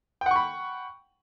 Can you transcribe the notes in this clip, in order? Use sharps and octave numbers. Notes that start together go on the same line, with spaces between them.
F#5 G5 B5 C#6